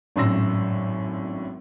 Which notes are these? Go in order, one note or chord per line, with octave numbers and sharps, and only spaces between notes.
G#1 F#2 A2 C6 E6 A#6